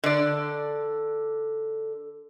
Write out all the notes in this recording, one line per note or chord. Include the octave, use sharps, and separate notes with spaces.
D3 D5